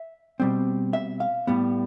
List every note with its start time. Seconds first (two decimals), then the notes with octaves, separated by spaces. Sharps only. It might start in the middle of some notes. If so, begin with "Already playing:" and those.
Already playing: E5
0.40 B2 G3 C4
0.93 E5
1.20 F5
1.47 A2 G3 B3